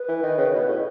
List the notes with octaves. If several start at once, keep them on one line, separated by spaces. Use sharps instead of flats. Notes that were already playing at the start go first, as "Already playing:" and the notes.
Already playing: B4
E3
D#3
C#3
B2
A2